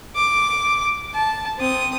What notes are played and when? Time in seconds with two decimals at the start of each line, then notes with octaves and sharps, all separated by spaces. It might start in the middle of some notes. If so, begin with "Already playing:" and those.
0.16 D6
1.14 A5
1.58 C4 D#6